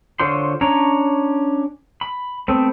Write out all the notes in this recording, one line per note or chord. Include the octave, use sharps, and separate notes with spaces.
D3 F4 C5 C#5 C6
C#4 D4 C#5 A#5
B5
A3 B3 C4